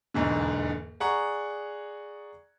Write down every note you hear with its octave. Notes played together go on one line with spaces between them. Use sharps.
D#1 B1 E2 G#2 D3
G#4 D5 F#5 A#5 C#6